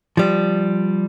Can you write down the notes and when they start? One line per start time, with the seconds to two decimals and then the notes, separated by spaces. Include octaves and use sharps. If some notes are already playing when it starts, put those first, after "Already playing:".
0.17 F3 G3